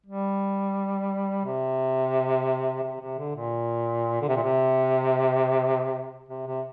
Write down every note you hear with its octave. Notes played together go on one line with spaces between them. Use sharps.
G3
C3
C3
C3
D3
A#2
D3
C3
A#2
C3
C3
C3